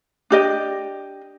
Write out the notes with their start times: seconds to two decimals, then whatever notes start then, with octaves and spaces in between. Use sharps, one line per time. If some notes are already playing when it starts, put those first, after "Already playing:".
0.30 D4 G4 D#5